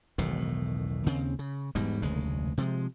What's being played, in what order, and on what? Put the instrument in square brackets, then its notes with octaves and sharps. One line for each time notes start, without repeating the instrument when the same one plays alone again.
[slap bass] E1 B1 A2 D#3
D#2 C#3 C4
C#3
E1 G#2 B2 G3
F1 D2 C#3 G#3
C3 F3 G3 G#3